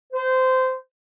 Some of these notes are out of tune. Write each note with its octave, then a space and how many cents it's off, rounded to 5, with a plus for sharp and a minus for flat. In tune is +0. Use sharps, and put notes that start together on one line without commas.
C5 -20